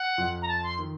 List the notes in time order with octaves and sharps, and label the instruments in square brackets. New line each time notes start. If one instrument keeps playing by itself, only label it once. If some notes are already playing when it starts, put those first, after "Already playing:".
Already playing: [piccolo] F#5
[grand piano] F2 F3
[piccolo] A#5
A5
C6
[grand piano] D#3